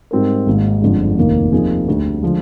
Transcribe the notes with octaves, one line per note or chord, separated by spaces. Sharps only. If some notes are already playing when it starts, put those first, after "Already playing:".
G#2 G3 C4 D#4 A#4
G#1 G#2 D#3 A#3
G1 F2 D3 G#3
F1 D#2 D#3 A#3
C3 F3 A#3 D#4 G#4
D2 D3 G3
D3 F3 G#3